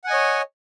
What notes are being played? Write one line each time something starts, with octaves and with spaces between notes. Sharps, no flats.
C#5 D#5 F#5 G#5